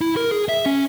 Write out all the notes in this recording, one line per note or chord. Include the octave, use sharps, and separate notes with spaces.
E4
A#4
G#4
E5
C#4